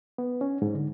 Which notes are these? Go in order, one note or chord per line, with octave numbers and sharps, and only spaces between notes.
B3
C#4
G#2
D3